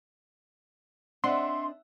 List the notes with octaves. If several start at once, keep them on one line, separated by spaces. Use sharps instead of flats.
C4 D4 D#5 E5 F#5 C6